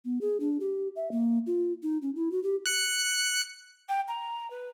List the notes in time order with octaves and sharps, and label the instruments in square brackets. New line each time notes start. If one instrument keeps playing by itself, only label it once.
[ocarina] B3
G#4
D4
G4
E5
A#3
F4
D#4
C#4
E4
F#4
G4
[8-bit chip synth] F#6 C#7
[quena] G5
A#5
B4